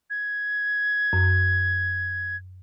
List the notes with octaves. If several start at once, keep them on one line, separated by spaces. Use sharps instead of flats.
G#6
F#2